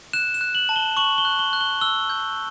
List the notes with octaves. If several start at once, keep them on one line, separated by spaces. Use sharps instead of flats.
F#6 E7
E7
F#6
F#7
A5
G7
C#6 F#7
G7
F#6
G7
F#6
G7
E6 G7
G6